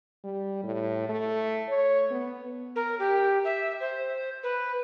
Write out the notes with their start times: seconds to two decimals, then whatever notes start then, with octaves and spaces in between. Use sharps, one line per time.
0.24 G3
0.63 A2
1.09 A3
1.68 C#5
2.11 B3
2.76 A#4
2.99 G4
3.44 E5
3.80 C5
4.43 B4